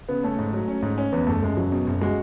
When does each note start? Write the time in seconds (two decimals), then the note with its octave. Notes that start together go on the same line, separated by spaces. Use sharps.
0.09 C#3 B3
0.23 A3 C#4
0.39 G#2
0.53 F#3
0.68 C#4
0.82 G#2
0.98 C#4
1.12 E2 B3
1.27 F#1 A3
1.43 F#1 G#3
1.56 F#1 F#3
1.72 B2
1.87 F#1
2.01 G#3 F#4